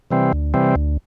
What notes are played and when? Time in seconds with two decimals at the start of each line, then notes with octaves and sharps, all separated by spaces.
0.11 C3 E3 G3 C4
0.33 D2
0.54 C3 E3 G3 C4
0.76 D2